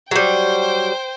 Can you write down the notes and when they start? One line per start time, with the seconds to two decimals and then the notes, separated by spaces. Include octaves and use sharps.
0.11 F#3 G3 C5 G5